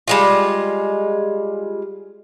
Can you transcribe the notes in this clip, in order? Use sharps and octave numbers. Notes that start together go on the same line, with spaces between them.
G3 G#3 F4